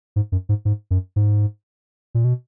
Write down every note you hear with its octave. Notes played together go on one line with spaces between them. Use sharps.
G#2
F#2
G#2
G#2
F#2
G#2
A#2
B2